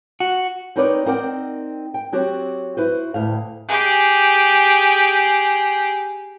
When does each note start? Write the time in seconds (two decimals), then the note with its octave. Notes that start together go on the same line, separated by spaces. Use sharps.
0.20 F#4
0.76 C4 D#4 A#4 B4 C#5 D5
1.06 C4 D#4 A#4 D5 F#5 G5
1.94 G5
2.12 F#3 C4 F#4 G4 C#5
2.77 E4 F#4 B4 C5
3.14 D2 A2 F5
3.69 G4 G#4